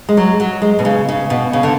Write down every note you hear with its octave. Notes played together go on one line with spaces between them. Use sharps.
G#3
F#3
F#3
G#3
B2
C#3
C#3
B2
C#3
D3